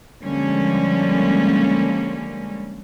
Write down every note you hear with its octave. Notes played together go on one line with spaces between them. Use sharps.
D3 F3 G3 G#3 A#3 C#4